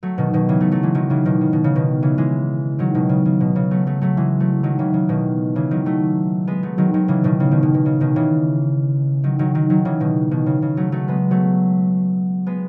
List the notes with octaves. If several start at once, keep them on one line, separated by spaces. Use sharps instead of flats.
F#3 A3
B2 D#3
B2 D#3
C#3 E3
F#3 A3
F#3 A3
E3 G#3
D#3 F#3
C#3 E3
B2 D#3
C#3
B2
C#3
B2 D#3
C#3 E3
E3 G#3
D#3 F#3
B2 D#3
C#3
C#3
B2
C#3
F#3 A3
F#3 A3
F#3 A3
E3 G#3
F#3 A3
D#3 F#3
C#3 E3
C#3
B2 D#3
C#3 E3
D#3 F#3
F#3 A3
G#3 B3
F#3 A3
D#3 F#3
D#3 F#3
C#3 E3
B2 D#3
C#3
B2 D#3
B2
B2
C#3
B2 D#3
C#3 E3
D#3 F#3
D#3 F#3
D#3 F#3
D#3 F#3
C#3 E3
B2 D#3
B2 D#3
C#3
C#3
F#3 A3
F#3 A3
G#3 B3
F#3 A3
G#3 B3